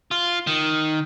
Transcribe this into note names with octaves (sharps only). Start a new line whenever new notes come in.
F4
D#3